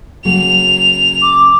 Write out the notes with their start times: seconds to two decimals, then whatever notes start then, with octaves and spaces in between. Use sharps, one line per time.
0.25 C#3 F#3 A#3 F7
1.22 D6